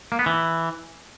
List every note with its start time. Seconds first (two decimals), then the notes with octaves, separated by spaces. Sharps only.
0.12 A#3
0.19 B3
0.26 E3